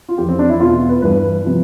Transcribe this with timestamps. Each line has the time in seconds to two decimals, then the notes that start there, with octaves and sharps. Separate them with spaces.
0.09 F4
0.18 F2 G4
0.22 E3
0.29 C4
0.39 D4
0.50 E4
0.60 E2 B2 F4
0.89 B4
1.02 G2 E3 B4
1.45 C3 F3